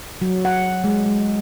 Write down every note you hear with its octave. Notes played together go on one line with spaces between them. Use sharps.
F#3
F#5
G#3
G#3